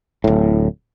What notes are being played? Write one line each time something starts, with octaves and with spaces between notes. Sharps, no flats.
D1 A2